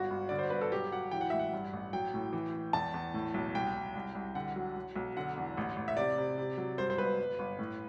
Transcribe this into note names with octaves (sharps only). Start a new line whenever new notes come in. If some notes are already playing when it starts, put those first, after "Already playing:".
Already playing: G1 F#4
G1
D3 D5
C5
G1 B4
A4
F#3 G4
F#3 F#5
E3 G5
F#5
A1 E5
F#5
G2
A1
F#3 G5
A2
E3
E3
E2 A5
E2
A2
B1
C2 G5
C2
C2
C2
D3 F#5
F#3
F#3
B1
D3 F#5
E2
A1
A1
E5
C3 D5
C3
C3
F#3
G2 C5
C5
G1 B4
G1
G1
A2